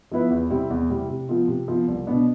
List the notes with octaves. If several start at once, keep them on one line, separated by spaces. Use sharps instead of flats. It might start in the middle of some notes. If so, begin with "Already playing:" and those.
F3 B3 E4 B4
E2
C3 G3 C4 E4
E2
C3 G3 C4 E4
C3
F3 B3 F4
C3
F3 B3 F4
C2
B2 B3 D4